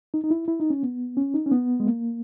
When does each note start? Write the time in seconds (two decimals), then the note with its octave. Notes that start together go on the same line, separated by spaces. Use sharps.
0.14 D#4
0.24 D#4
0.31 E4
0.48 E4
0.60 D#4
0.70 C#4
0.83 B3
1.17 C#4
1.34 D#4
1.46 C#4
1.51 B3
1.80 G#3
1.87 A#3